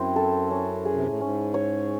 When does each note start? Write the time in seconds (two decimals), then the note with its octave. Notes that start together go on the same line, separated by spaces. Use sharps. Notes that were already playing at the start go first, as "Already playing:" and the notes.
Already playing: F#2 C4 E4
0.16 A4
0.51 C#4
0.85 G#4
0.94 C3
1.06 A2
1.20 G#2 C#4
1.54 C#5